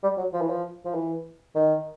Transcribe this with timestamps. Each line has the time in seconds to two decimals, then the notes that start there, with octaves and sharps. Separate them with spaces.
0.03 G3
0.18 F#3
0.33 F3
0.41 E3
0.49 F3
0.85 F3
0.94 E3
1.55 D#3